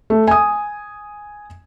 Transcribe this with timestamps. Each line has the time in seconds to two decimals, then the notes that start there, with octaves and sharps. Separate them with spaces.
0.10 A3
0.28 G#5 D#6